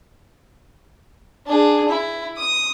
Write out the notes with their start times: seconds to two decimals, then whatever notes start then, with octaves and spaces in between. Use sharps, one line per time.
1.46 D4 G#4
1.89 E4
2.36 D#6